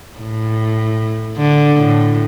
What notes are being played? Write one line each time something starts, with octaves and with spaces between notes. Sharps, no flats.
A2
D3
A2